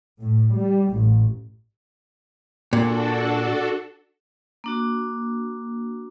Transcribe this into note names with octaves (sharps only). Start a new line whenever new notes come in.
A2
G3
A1
A#2 D4 F#4 A4
A#3 D4 F#4